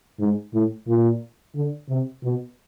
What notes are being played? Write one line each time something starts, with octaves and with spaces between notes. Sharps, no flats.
G#2
A2
A#2
D3
C3
B2